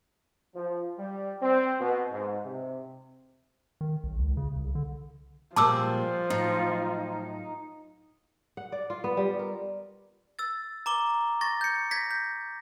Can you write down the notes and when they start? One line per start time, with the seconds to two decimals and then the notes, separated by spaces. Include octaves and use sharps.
0.55 F3
0.98 G3
1.42 C4
1.80 B2
2.12 G#2
2.44 C3
3.81 D#3
4.04 B1
4.19 C#2
4.37 C#3
4.56 C2
4.75 D3
5.56 A#2 F3 G3 G#3 A5 D6 E6
6.30 A2 F#3 D#4
8.57 F#5
8.72 D5
8.90 F4
9.04 B3
9.17 G3
9.39 A#4
10.39 E6 A6
10.86 A#5 D6 G7
11.41 C#6 A6 A#6
11.61 G6 C#7
11.91 G#6 A#6 B6
12.11 G6